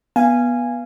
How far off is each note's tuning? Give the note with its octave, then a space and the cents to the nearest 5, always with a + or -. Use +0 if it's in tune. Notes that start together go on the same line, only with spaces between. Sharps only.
B3 -20 F5 -20 G#5 -10